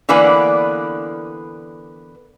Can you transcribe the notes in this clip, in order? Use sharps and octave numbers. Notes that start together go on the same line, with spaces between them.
D3 E3 A#3 B3 B4 D5